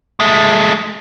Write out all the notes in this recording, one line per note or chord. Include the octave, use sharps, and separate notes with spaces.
G#3 A3